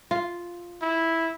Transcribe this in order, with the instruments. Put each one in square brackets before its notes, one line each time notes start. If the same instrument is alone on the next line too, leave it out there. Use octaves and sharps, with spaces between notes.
[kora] F4
[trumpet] E4